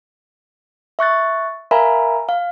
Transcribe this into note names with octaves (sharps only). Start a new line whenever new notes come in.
E5 C#6 F#6 A6
A#4 E5 F5 G#5 A#5 B5
F5